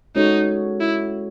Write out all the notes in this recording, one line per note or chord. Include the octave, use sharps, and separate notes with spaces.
G#3 C#4 D#4 F#4 A4 C#5
E4